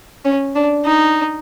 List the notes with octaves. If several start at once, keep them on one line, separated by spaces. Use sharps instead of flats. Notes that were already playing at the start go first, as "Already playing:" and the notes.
C#4
D4
D#4